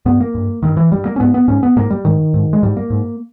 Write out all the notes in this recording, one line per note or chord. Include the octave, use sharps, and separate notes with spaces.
G2 B3
A#3
G2
G2 D#3
E3
G2 G3
A#3
C#4
G#2 B3
B3
G#2 C#4
B3
G#2 A#3
G3
G#2 D#3
G#2
G#3
G#2 G3
A#3
G#2